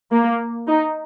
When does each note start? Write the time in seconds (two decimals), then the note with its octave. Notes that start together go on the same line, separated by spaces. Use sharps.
0.11 A#3
0.67 D#4